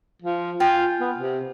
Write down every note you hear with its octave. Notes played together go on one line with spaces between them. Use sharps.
F3
F4 G5 G#5
B3
C3